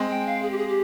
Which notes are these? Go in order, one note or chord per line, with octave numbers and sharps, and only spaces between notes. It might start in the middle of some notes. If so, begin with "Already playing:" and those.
Already playing: G#3 C4
G5
F5
G#4
G4
G#4
G4